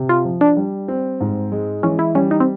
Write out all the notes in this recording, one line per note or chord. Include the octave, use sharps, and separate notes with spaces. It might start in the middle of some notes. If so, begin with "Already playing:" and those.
Already playing: C3
F4
F3
D4
G3
C4
G#2
G#3
E3 C#4
E4
G3 C#4
D#4
C4